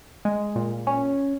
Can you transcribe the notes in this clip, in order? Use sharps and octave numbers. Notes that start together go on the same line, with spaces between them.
G#3
A#2
C#4